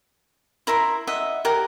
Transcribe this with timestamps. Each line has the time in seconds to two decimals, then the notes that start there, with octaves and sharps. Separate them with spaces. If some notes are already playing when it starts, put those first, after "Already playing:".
0.67 E4 A#4 E5 C6
1.07 D#5 E5 F#5
1.45 G4 A#4 F#5